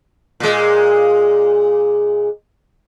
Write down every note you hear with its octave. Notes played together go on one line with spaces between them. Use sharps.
A#2 G#3